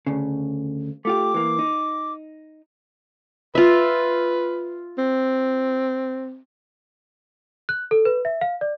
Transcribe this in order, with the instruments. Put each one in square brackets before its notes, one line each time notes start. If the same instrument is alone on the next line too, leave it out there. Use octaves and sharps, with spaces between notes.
[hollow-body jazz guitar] D2 C#3
[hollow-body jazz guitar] A3 F4 G4 [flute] D6
[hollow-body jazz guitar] E3 A#3
D#4
[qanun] F4 E5 [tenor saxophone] B4
[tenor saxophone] C4
[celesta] F#6
A4
B4
E5
F5
D5